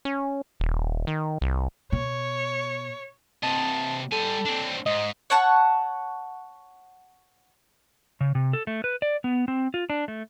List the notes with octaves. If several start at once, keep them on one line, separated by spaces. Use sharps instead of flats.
C#4
D#1
D#3
C2
B2 C#5
C3 D#5 A5
G3 A4 G#5
C4 D4
G#2 D#5
C#5 F#5 A5 C#6
C#3
C3
A4
A3
B4
D5
B3
C4
F4
D4
A3